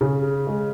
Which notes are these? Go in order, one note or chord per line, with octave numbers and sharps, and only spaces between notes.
C#3
G#3